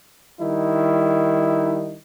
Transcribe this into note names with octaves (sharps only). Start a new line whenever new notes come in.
D#3 G3 D#4 E4